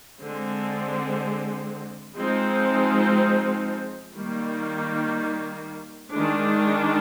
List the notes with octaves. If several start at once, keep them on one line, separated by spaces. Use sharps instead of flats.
D3 G#3 C4
F3 G#3 C4 D#4
D#3 G3 A#3
D#3 G#3 D4